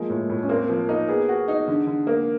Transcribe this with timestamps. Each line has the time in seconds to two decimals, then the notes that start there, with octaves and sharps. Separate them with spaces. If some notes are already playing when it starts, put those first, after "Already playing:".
Already playing: F3 G#3 A#3
0.10 A2
0.29 A2
0.43 C#4
0.49 A#3 C4
0.69 F3
0.89 A#3 D#4
1.08 B3 G#4
1.29 F#4
1.48 D#4
1.68 D3
1.87 D3
2.07 A#3